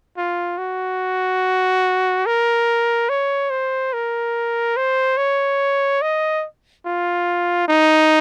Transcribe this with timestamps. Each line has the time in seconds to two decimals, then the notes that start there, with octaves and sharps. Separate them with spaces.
0.17 F4
0.58 F#4
2.26 A#4
3.09 C#5
3.50 C5
3.93 A#4
4.76 C5
5.17 C#5
6.02 D#5
6.85 F4
7.68 D#4